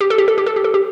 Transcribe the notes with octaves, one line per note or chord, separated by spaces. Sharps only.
G4
A4
G4
A4
G4
A4
G4
A4
G4